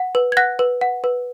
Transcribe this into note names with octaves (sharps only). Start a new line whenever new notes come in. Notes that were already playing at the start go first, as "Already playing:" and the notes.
Already playing: F#5
B4
G#6
F#5 F#6 A#6
B4
F#5
B4